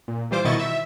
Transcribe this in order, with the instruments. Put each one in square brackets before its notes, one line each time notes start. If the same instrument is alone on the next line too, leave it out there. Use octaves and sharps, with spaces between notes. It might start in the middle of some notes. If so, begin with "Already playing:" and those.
[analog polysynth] A#2
E3 G3 F4 C5 D6
B2 D#3 E4 D#5 C#6 A6
E5